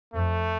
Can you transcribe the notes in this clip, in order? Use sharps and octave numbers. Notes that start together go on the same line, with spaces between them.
F2 A3